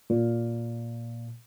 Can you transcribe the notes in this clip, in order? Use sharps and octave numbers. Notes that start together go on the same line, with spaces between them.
A#2